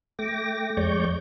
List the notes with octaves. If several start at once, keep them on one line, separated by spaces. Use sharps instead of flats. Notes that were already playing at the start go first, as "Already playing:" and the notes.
A3 G5 D6 A#6
F2 G#3 C#5 D5 C#6 G6